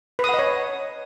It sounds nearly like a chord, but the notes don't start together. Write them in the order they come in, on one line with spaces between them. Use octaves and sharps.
B4 D#6 F#5 D#5 C#5